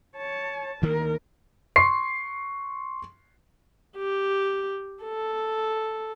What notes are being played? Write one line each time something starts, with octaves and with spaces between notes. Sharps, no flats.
C#5 A5
D2 D#3 A#3 A#4
C6 C#6 C7
G4
A4